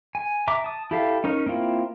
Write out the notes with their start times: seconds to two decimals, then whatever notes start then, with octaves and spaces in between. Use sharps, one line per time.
0.15 G#5
0.48 E5 A#5 D6
0.64 A5 D#6
0.91 E4 G4 A4 E5 F5
1.24 C#4 D#4 A#4
1.46 A#3 C4 E4 F4